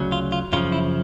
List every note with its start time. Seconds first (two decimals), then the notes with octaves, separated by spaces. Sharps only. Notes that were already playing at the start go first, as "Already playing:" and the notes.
Already playing: D2 C#3 F#3
0.12 F4
0.32 F4
0.53 F#2 C#3 F3 F4
0.72 E4